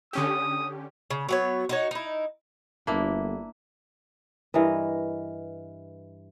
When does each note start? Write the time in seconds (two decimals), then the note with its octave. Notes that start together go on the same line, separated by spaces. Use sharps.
0.13 D3 C#4 G4 D#6
1.10 C#3
1.29 F#3 B3 C#5
1.69 D#4 F#4 C#5
1.91 D#4 E4
2.87 G1 A#3 D4 E4
4.54 G2 E3 A#4 D#5